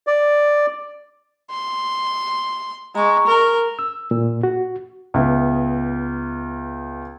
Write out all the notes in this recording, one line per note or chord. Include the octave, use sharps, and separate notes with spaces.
D5
C6
G#3 A#5 C#6
A#4
E6
A#2
F#4
C#2 B3 E5